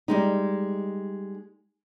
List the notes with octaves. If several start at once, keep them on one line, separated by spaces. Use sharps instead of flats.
G3 G#3 D#4